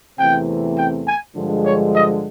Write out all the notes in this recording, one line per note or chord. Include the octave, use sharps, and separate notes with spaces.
E2 C3 E3 A3 C4 G5
G5
G#5
G2 D3 F3 G#3
C#5
D#5